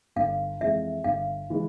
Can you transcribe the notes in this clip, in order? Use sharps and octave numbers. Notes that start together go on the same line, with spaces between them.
G1 F5
F2 E3 G#3 E5
G1 F5
E3 G#3